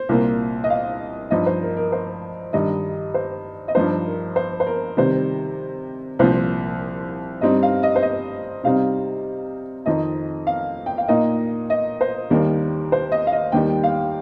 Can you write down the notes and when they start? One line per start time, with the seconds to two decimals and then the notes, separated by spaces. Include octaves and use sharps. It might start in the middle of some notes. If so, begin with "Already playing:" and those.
Already playing: C5
0.09 C2 A#2 A#3
0.64 D#5
0.70 F5
1.31 G2 F3 D#4 D#5
1.46 C5
1.62 A#4
1.77 A#4
1.92 C5
2.53 G2 D#3 G3 D#4 D#5
3.14 C5
3.68 D#5
3.75 G2 F3 D#4 C5
4.06 A#4
4.36 C5
4.60 C5
4.67 A#4
4.97 C3 D#3 G3 C5
6.19 C2 A#2 F3 C5
7.41 G2 G3 C4 D#4 D#5
7.63 F5
7.83 D#5
7.96 C5
8.02 D#5
8.63 C3 G3 C4 D#4 F5
9.86 F2 D#3 C4 D#4 D#5
10.47 F5
10.86 G5
10.98 F5
11.08 A#2 A#3 D#4 D#5
11.70 D#5
12.01 C5
12.30 D#2 D#3 G3 A#3 A#4
12.92 C5
13.12 D#5
13.27 F5
13.32 D#5
13.52 D#2 D#3 G3 G5
13.84 F5